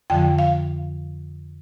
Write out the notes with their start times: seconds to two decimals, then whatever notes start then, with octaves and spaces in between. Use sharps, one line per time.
0.10 F2 D3 F3 G5
0.39 F5